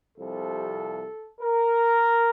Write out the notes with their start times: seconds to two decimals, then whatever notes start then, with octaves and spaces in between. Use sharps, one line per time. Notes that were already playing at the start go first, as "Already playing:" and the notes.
0.17 C2 C3 F3 A4
1.41 A#4